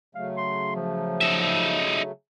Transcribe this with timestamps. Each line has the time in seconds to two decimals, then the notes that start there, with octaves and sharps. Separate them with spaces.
0.15 C#3 F#3 A3 F5
0.37 C6
0.76 F3
1.21 D#4 E5